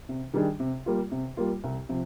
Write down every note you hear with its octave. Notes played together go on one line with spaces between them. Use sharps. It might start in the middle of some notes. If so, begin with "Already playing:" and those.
C3
D#3 G3 D4 G#4
C3
G3 A#3 F4
C3
G3 A#3 F4
C2
C3 F3